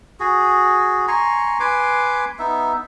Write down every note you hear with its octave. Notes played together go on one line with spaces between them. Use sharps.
F#4 G#4
G#5 A#5 C6 C#6
B4 G#5 C6 D6
B3 D#4 E5